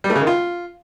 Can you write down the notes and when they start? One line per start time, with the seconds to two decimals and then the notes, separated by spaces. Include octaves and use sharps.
0.04 G3
0.10 A3
0.15 C#3
0.21 D#3
0.27 F4